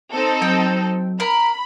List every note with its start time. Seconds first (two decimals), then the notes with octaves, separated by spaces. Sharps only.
0.12 C4 D#4 A4
0.42 F#3 G5
1.20 A#4 B5